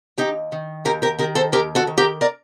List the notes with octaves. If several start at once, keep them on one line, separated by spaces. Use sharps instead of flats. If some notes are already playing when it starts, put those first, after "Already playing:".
D#2 D#4 G4
D#3
D#2 G4 A#4
G4 A#4
D#3 G4 A#4
A4 C5
D#2 G4 A#4
F#4 A4
D#3
G4 A#4
A#4 D5